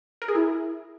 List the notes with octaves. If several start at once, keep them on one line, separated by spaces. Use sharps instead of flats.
A#4
G#4
E4